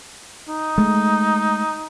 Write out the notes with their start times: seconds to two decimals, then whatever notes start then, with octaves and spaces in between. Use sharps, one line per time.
0.48 D#4
0.78 G#3 A3